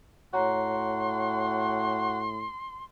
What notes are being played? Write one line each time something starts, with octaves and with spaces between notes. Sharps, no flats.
A2 F#4 C#5 A#5 C6